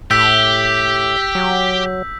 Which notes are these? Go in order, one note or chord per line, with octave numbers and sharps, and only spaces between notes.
A2 G4 E6 G6 B6
F#3